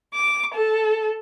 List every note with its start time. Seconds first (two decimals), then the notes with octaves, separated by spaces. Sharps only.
0.13 D6
0.54 A4